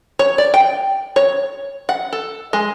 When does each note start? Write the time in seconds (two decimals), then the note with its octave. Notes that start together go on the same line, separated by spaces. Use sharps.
0.19 C#5
0.38 D5
0.54 G5
1.16 C#5
1.89 F#5
2.13 A4
2.53 G#3